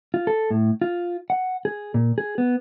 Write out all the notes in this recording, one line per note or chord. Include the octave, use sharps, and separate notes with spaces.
F4
A4
A2
F4
F#5
G#4
A#2
G#4
B3